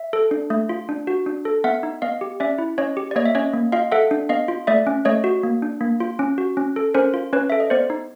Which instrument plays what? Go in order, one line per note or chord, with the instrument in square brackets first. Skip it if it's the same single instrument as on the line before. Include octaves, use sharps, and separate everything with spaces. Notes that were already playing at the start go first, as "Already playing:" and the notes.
Already playing: [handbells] E5
A4
D4
A3
F4
D4
F#4
D4
A4
B3 E5 F#5
D#4
B3 D#5 F5
G4
C#4 D5 E5
E4
C#4 C#5 D#5
G4
D5
A#3 C#5 D#5
E5
C#4 C#5 D#5
A#3
F4 D#5 F5
A4 E5 F#5
D4
B3 D#5 F5
F4
A3 D5 E5
C#4
A3 C#5 D#5
F#4
A#3
D4
A#3
F4
C#4
F#4
C#4
A4
C#4 A#4 C5
F4
C#4 B4 C#5
A4 E5
D#5
B3 C5 D5
D#4